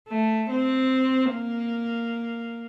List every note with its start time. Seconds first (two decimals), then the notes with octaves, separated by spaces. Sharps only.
0.09 A3
0.50 C4
1.32 A#3